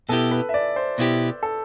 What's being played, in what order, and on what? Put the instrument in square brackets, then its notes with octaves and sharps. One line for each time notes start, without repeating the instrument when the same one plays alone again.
[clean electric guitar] B2 B3 E4 G4 [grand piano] A4
[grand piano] B4
E5
D5
C5
[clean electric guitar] B2 B3 E4 G4
[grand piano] A4